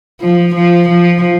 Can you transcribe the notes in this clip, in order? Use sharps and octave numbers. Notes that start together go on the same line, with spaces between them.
F3
F3
F3